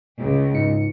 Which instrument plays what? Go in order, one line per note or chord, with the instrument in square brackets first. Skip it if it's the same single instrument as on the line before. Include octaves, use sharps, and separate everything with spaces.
[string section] C#2
[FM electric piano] G#2 D#4 C#7